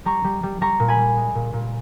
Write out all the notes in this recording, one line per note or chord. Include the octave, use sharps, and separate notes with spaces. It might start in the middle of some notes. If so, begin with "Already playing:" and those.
G3 A#5 C#6
G3
G3
G3 A#5 C#6
A#2
G#5 B5
G3
G#3
A#2
A#2